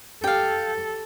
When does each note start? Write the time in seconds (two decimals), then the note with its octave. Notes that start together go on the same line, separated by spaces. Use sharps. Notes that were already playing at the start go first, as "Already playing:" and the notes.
0.24 G4 A4 F5 G5